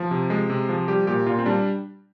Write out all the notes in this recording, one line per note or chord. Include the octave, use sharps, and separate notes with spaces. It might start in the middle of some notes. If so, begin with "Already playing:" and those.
Already playing: F3
C3
G#3
C3
F3
G3 G4
A#2 G4
A#2 F4
C4
G3 D4